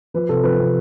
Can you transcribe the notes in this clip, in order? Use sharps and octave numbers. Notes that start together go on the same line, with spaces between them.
F3 B4
C3 A4
F3 B4
C3